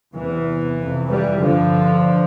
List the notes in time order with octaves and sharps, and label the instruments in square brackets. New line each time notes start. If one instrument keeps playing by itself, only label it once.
[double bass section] E2 C3 E3
F2 C3
E3 G3
G2 D3 F3